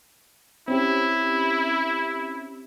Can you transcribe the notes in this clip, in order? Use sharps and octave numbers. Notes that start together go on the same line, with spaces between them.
C4 C#4 E4 G4